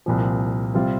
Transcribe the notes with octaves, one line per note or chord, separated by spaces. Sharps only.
C2 A#2 F3
C3 G3 C4 F4